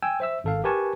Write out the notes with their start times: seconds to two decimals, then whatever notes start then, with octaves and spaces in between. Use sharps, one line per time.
0.03 G5 G#5 E6
0.20 C5 E5 E6
0.44 G#1 A4 F5
0.64 G4 A#4 B4 G#5 A5 C#6